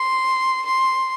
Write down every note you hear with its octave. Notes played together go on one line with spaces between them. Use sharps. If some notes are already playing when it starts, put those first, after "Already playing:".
Already playing: C6
C6